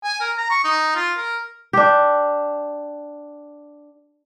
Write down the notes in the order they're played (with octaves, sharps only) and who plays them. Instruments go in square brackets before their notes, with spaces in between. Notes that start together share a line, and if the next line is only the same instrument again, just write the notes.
[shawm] G#5
A#4
A#5
C#6
D#4
F4
A#4
[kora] D4 G4